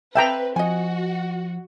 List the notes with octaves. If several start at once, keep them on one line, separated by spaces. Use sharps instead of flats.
C4 B4 E5 F5 G5 A5 A#5
F3 F#4 D#5 G#5